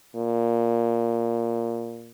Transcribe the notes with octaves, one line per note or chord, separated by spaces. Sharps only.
A#2